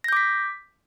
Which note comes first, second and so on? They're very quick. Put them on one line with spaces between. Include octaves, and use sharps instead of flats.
A#6 G6 D6 B6